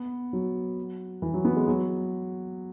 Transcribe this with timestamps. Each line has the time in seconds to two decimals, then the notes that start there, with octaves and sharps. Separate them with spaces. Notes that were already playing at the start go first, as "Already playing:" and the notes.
Already playing: B3
0.33 F#3
1.22 E3
1.34 F#3
1.45 B3
1.56 G#3
1.68 F#3